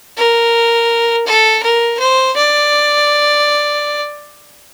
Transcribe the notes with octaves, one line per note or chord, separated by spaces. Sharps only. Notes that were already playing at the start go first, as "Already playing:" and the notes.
A#4
A4
A#4
C5
D5